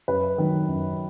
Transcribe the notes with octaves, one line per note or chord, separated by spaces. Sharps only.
F#2 B4
D#3 F#3
F#2